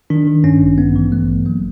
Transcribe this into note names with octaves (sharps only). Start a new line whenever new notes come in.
D#3 D4
D#3
G2 C#4
A1
G2 B3
E3
G#1 A3
G#1
F#3 A#3